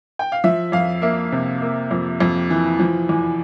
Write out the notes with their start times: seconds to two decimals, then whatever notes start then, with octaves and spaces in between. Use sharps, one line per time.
0.19 G5
0.32 F5
0.44 F3 E5
0.72 F2 F5
1.02 A#3 E5
1.32 C3
1.62 A#3
1.91 F2
2.20 F2
2.50 E3
2.79 F3
3.09 E2